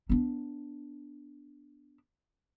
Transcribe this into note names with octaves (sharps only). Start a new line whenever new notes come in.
B3 D4